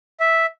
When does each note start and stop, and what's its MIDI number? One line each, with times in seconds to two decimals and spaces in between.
0.20 0.46 76